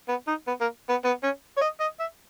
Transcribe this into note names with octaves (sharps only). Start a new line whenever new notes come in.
B3
D#4
B3
A#3
B3
B3
C#4
C#5
D#5
D#5
E5